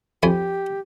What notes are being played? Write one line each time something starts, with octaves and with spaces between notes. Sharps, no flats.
F2 G4 G#5 B5